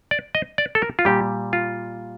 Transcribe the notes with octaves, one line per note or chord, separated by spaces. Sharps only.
D5
D#5
D5
A4
A#4
F4
A#2 G3 G4
F4